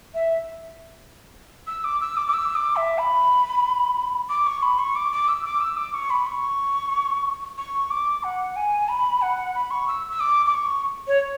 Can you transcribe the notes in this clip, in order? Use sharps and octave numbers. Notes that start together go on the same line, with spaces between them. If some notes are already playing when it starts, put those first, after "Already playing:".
E5
E6
D6
E6
D6
D6
E6
D6
E5
B5
D6
C#6
B5
C#6
D6
D6
E6
D6
E6
D6
C#6
B5
C#6
C#6
D6
F#5
G#5
B5
F#5
B5
C#6
E6
E6
D6
D6
C#6
C#5